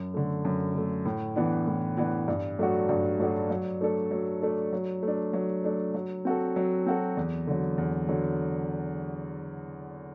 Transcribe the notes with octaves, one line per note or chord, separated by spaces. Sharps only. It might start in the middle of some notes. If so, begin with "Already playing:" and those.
Already playing: F#2
D3 A3
F#2
D3 A3
A2
E3 B3 D4
A2
E3 B3 D4
G2
F#3 A3 D4 F#4
G2
F#3 A3 D4 F#4
F#3
A3 D4 A4
F#3
A3 D4 A4
F#3
A3 D4
F#3
A3 D4
F#3
C4 F#4 A4
F#3
C4 F#4 A4
E2
D3 F#3
E2
D3 F#3